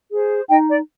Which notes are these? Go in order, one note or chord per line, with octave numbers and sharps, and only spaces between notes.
G#4 C5
D#4 D#5 G5
D5